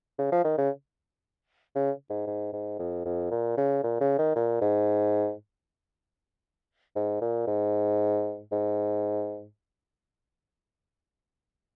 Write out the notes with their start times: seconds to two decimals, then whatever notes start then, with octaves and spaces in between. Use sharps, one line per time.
0.19 C#3
0.32 F3
0.45 D#3
0.58 C#3
1.75 C#3
2.10 G#2
2.27 G#2
2.53 G#2
2.79 F2
3.05 F2
3.31 A#2
3.57 C#3
3.84 A#2
4.01 C#3
4.18 D#3
4.36 A#2
4.61 G#2
6.96 G#2
7.22 A#2
7.47 G#2
8.52 G#2